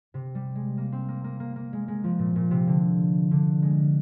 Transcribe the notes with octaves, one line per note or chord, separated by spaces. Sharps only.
C3
G3
G#3
A#3
C4
A#3
A#3
A#3
A#3
G#3
G#3
F3
A#2
A#2
C3
D3
D3
G#3